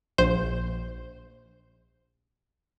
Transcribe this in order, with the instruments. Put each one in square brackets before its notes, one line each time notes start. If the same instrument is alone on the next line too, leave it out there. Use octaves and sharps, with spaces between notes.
[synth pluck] A#1 C5